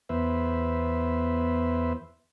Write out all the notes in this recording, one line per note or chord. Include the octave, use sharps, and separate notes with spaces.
E2 B3 B4 C5 E5